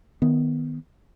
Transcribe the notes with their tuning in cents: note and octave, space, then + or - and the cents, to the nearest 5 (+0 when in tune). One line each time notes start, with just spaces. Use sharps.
D#3 +0 B3 +0